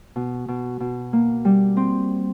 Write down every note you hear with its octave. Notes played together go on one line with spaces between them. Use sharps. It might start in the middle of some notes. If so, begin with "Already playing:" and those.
B2
B2
B2
A#3
G3
C4